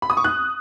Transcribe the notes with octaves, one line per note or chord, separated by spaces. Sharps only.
B5
D#6
C#6
F#6